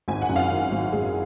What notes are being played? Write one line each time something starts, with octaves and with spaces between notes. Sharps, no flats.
G#1 G#5
F#5
F#2
F5
D#3
G#1
G#1 G#4